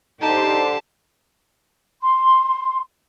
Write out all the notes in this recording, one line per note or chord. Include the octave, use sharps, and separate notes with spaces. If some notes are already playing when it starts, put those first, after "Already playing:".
D3 D#4 G4 C5 A5
C6